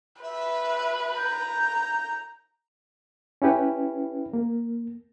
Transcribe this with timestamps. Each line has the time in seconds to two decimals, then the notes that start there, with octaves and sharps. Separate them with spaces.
0.22 B4 E5
1.17 A#5 G6
3.42 C#4 E4 G4 B4
4.33 A#3